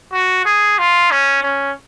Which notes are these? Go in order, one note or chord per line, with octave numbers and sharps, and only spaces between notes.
F#4
G#4
F4
C#4
C#4